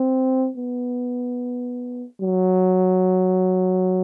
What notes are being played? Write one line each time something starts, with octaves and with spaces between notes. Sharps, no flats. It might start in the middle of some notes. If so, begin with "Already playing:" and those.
Already playing: C4
B3
F#3